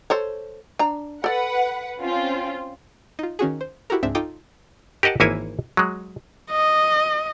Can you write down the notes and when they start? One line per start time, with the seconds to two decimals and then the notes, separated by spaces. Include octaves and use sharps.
0.10 A4 C5 C#5
0.79 D4 A#5
1.24 A4 B4 D5 F#5
2.00 C4 C#4 F4
3.19 D#4 F4
3.39 D#3 C#4 F#4 G#4
3.61 C5
3.90 E4 F#4 G4 A4 A#4
4.03 C#2 G#2 C4 D4 E5
4.15 D#4 F4 A4 G5 D6 D#6
5.03 G4 A#4 D#5 F#5 A5
5.20 G#1 E3 A#3 E4 C#5 G#5
5.77 F#3 G#3
6.50 D#5